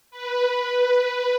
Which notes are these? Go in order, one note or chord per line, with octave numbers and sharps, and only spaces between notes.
B4